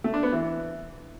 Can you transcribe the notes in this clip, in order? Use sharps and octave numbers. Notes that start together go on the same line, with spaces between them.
A3
D4
B3
E3